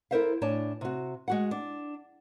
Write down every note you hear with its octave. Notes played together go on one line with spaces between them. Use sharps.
E4 A4 A#4 C5 E5 F5
A2 D4 C#5 D5 G#5 A5
C3 F#4
G#3 F#4 F#5
D4